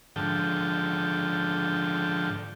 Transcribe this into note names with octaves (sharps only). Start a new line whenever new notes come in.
G#2 D3 F3 A4 G5